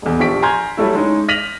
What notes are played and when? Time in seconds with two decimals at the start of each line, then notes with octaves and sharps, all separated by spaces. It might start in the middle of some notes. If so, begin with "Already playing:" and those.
0.02 D#1 E2
0.20 A#1 F3 G4 C#6 B6 D7
0.42 G#5 A#5 C6 F6 G6 G#6
0.77 F#3 G3 A3 E4
0.95 G#3 C#4 D#4
1.28 F6 A#6 B6 D#7 F7 F#7